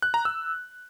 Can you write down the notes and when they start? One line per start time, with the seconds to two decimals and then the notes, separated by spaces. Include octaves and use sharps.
0.02 F#6
0.14 A#5
0.25 E6